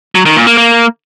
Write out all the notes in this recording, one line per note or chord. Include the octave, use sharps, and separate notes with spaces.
F#3
D#3
A#2
A#3
A#3